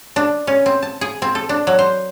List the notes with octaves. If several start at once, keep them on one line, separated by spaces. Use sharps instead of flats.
D4
C#4
C4
A5
G#4
C4
A4
D4
F#3
C5